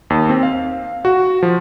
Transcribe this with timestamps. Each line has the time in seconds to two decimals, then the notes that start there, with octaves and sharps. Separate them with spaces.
0.10 D#2
0.29 C4
0.43 F5
1.05 F#4
1.43 F3